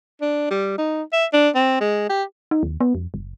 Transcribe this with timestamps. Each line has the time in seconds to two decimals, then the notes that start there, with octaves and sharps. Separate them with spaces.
0.21 D4
0.50 G3
0.78 D#4
1.13 E5
1.33 D4
1.55 C4
1.81 G#3
2.09 G4
2.51 D#4
2.63 D#2
2.81 B3
2.95 F2
3.14 F#1